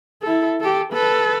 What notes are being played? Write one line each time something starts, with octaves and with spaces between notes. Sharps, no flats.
E4 A4
G4 A4
A4 B4